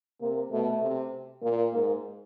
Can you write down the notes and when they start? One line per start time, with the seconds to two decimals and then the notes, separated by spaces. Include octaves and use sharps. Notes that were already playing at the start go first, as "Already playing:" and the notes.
0.21 C3 A#3
0.51 B2 A3
0.82 C3
1.42 A#2 A#3
1.73 G#2 A#3